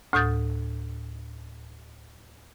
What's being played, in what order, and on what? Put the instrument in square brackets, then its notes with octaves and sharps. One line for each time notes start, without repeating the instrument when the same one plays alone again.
[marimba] D2 A2 D#6 G6 A6